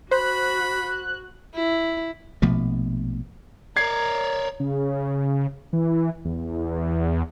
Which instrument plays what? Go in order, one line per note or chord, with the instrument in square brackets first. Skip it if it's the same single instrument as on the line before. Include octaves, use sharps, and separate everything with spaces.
[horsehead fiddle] F#4 [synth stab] C5 [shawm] B5 [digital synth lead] F#6
[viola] E4
[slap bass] A#1 B2 F3 A3
[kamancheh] A#4 [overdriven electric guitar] C#5 D5 [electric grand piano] G#6 C7
[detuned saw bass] C#3
E3
E2